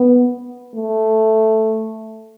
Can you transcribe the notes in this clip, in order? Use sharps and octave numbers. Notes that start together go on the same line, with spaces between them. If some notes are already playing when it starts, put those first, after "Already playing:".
Already playing: B3
A3